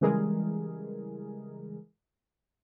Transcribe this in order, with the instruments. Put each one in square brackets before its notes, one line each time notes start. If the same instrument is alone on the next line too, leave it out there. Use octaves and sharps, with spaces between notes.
[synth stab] C#3 E3 G3 G#3 G#4 A#4